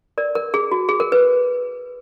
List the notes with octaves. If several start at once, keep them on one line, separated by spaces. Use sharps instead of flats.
A#4 D5
A#4
G#4
F#4
G#4
A#4
B4